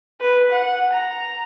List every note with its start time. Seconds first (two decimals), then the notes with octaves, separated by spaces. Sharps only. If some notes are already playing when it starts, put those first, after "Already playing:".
0.21 B4
0.52 F#5
0.93 A#5